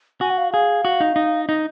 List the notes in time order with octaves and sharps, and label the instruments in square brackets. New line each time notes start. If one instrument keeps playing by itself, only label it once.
[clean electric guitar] F#4 [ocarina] G#5
[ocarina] F#5
F5
[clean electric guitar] G#4 [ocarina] F5
[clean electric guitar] F#4
D#4
D#4
D#4